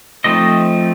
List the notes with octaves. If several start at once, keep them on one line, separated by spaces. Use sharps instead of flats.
F3 A3 C4 D#4 D#5